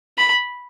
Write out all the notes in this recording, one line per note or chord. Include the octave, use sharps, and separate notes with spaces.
B5